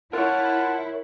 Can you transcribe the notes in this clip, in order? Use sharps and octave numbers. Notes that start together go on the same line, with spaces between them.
E4 F4 A#4 C#5 F#5 A5